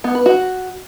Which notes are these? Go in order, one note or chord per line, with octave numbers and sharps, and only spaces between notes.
B3
B4
F#4